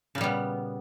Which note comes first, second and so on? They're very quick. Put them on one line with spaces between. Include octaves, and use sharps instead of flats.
C#3 A#2 G3 B3